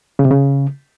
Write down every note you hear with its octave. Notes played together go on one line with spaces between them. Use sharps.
C#3
C3
C#3